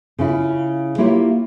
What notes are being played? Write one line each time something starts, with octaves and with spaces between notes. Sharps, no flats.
C#3 C#4 E4 F4
A#3 E4 F4 G4 C#5